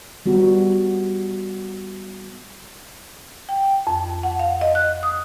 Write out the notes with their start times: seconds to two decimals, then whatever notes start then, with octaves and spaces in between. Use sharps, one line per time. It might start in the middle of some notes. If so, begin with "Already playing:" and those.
0.26 G3 B3 F#4
3.49 G5
3.87 F2
4.23 F#5
4.39 F5
4.61 D#5
4.75 F#6
5.03 D#6